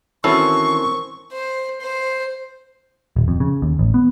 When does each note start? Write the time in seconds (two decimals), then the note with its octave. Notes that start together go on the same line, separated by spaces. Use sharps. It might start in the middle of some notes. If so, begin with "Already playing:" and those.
0.24 D#3 E3 C4 C#4 E4 F#4 A4 C#6
1.32 C5
1.81 C5
3.16 D#1
3.28 F2
3.40 C#3
3.62 D#2
3.79 A1
3.94 B3